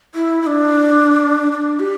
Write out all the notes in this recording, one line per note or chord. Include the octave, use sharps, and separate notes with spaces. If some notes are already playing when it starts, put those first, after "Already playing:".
E4
E4
D4
D4
G4